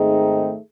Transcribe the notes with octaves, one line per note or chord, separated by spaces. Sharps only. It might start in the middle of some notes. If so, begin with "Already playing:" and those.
Already playing: G#2 D#3 A3 C4 D#4 G#4